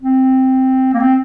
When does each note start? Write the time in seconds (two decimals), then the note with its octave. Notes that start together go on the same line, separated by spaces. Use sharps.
0.01 C4
0.94 A#3
1.00 C4